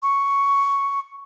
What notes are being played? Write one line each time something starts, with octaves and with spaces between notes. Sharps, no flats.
C#6